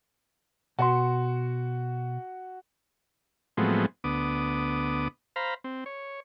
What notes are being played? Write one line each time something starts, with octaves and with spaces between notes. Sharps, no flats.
B2 F#4 D5 C6
A2 F3 F#3 G#3 B3 C4
D2 B3 D6 D#6
C5 F5 A#5 B5
C4
C#5